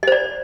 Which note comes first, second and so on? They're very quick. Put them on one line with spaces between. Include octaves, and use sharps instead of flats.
D#5 C5 D5